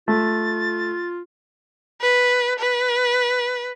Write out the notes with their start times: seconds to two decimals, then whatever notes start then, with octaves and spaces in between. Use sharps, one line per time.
0.08 A3 F4 A6
2.01 B4
2.59 B4